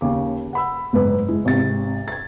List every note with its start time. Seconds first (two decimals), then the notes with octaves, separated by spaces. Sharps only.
0.01 D#2 C#3 D6
0.53 F#5 B5 E6
0.93 F#1 G#2 B4
1.28 G#3 E4
1.45 G#1 C3 A6
2.08 G#6 A6